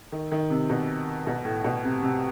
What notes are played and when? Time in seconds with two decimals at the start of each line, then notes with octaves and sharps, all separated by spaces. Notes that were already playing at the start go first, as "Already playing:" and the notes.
0.12 D#3
0.32 D#3
0.50 C3
0.70 B2
1.27 B2
1.45 A2
1.64 B2
1.84 C3
2.02 C3